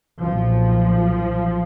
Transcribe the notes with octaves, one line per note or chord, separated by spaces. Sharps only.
B1 A#2 F3